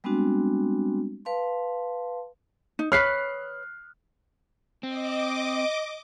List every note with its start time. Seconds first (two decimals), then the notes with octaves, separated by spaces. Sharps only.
0.04 G3 G#3 B3 C4 D4 F#4
1.25 B4 F5 A5 C6
2.79 D#4
2.92 B4 C#5 F6 F#6 C7
4.83 C4 D#5 D6